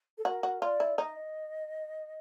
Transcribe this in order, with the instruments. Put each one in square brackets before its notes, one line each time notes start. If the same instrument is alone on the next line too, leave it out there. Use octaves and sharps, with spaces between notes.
[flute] A4
[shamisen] F#4 [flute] A#4
[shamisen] F#4
[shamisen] F4 [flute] D5
[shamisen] E4
[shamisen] D#4 [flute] D#5